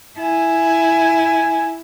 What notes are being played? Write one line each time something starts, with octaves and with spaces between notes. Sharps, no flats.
E4 G#5